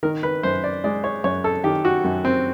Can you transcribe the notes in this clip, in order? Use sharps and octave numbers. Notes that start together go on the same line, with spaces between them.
D#3 A#4
B4
F#2 C5
D5
G#3 D5
C#5
F#2 C#5
A4
D#3 G4
F#4
F#2
C4